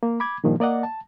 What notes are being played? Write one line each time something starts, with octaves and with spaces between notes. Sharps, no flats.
A#3
B5 D6 G#6
G2 A#2 D#3 F3
A#3 D5 D#5 F#5
A5